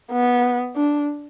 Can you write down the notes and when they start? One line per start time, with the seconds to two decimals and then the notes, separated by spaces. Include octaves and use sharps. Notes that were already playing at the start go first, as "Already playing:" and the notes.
0.12 B3
0.76 D4